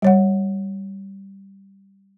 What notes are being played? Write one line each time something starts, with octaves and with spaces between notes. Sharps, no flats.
G3 C#5 F#5